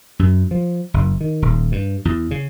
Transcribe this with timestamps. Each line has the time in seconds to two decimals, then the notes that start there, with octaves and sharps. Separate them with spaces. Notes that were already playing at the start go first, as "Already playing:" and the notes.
0.19 F#2
0.51 F3
0.94 F#1
1.21 D#3
1.42 D#1
1.72 G2
2.05 E2
2.31 C#3